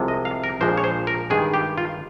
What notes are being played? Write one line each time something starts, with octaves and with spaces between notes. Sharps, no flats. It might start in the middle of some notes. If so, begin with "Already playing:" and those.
Already playing: C2 C3 F3 G#3
D#5
F5
A#4
A#1 A#2 F3 G#3 C5
C#5
C5
A#4
G2 D#3 G#3 G#4
G4
F4